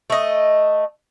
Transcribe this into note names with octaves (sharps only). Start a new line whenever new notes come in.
A3 D#5